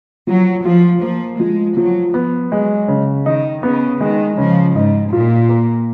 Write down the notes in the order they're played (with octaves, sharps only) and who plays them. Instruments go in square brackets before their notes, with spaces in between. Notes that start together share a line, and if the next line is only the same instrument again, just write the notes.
[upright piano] F3 [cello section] F#3
[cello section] F3 [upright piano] F4
[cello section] F3 [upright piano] A#3
[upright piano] F3 [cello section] G#3
[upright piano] F3 [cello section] F#3
[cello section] F3 [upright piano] B3
[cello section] F#3 [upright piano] G#3
[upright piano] C#3
[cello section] D#3 [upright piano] D#4
[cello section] C#3 [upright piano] B3
[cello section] D#3 [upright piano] G#3
[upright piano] C#3 [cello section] F3
[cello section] G#2 [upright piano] D#4
[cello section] A#2 [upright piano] F4
[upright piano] A#3